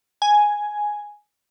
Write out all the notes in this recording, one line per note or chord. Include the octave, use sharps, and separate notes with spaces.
G#5